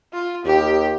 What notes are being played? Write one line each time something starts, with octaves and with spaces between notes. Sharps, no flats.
F4
D#2 G4